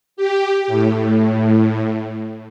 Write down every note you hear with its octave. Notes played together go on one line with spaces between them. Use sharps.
G4
A2